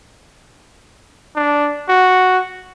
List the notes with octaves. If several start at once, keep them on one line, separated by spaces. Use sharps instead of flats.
D4
F#4